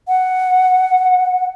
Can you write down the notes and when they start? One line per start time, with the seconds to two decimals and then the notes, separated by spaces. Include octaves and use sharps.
0.08 F#5